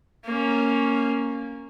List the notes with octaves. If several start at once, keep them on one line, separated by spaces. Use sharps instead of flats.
A#3 C#4